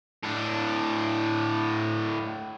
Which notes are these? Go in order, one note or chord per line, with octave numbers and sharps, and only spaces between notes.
A2 D4